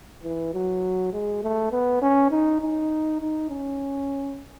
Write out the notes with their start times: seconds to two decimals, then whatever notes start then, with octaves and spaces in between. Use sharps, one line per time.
0.23 E3
0.54 F#3
1.13 G#3
1.43 A3
1.72 B3
2.02 C#4
2.31 D#4
2.61 D#4
3.21 D#4
3.49 C#4